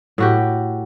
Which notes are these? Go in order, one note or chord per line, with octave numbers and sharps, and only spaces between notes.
A2 F#4 G4